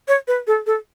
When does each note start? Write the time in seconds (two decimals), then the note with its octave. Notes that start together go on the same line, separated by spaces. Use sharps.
0.08 C#5
0.28 B4
0.47 A4
0.66 A4